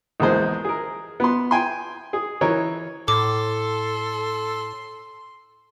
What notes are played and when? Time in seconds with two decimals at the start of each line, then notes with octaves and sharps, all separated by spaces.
0.20 A#1 E2 G#3 C5
0.65 G#4 A#4
1.20 B3 C6
1.51 G5 G#5 C6
2.13 G#4
2.41 E3 A#4 C#5
3.08 A2 A4 C6 D6